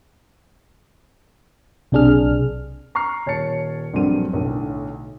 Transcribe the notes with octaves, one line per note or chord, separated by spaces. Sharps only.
B1 C3 D4 G#4 F6
A#5 C#6 F6 C7
D#1 C#5 A5 A6 C#7
A#1 G2 F#3 A3 C4 D#7
B1 A2 D3